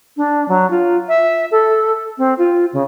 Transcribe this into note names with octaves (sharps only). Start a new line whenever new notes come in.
D4
F#3
F4
E5
A4
C4
F4
C#3